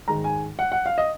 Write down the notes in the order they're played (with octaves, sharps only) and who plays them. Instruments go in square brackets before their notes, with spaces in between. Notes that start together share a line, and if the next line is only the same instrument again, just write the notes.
[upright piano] G#2 D#3 G#3 A#5
G#5
F#5
F#5
F5
D#5